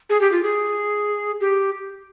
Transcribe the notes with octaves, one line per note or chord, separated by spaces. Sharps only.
G#4
G4
F4
G#4
G4